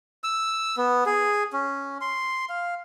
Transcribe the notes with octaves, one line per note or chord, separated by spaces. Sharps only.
E6
B3
G#4
C#4
C6
F5